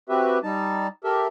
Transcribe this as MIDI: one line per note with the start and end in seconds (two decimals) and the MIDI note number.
0.09 0.39 60
0.09 0.39 66
0.09 0.39 67
0.09 0.39 71
0.09 0.39 76
0.43 0.87 55
0.43 0.87 63
0.43 0.87 81
1.04 1.27 67
1.04 1.27 69
1.04 1.27 70
1.04 1.27 76